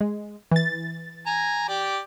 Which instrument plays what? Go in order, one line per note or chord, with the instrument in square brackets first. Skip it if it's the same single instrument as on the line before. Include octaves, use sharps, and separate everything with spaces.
[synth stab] G#3
E3 A6
[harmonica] G#5 A#5
G4 D5